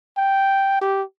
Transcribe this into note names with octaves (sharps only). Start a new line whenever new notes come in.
G5
G4